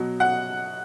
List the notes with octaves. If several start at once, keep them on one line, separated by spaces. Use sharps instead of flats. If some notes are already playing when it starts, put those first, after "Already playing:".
Already playing: B2 F#3
F#5